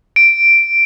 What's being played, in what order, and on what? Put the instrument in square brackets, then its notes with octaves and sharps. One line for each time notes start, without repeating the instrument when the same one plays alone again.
[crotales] D7